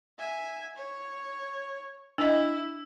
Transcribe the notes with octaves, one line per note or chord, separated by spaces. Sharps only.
E5 G#5
C#5
D4 E4 D#5 E6